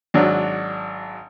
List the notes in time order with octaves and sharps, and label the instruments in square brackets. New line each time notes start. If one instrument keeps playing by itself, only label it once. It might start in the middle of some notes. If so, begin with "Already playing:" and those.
[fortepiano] G#1 F#3 D4